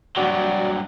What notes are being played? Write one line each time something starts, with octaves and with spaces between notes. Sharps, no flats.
A#1 G2 F#3 F#4 D5 F#5